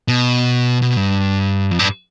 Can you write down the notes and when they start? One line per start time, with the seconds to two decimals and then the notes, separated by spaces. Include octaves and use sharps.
0.08 B2
0.82 B2
0.97 G2
1.71 F2
1.79 G2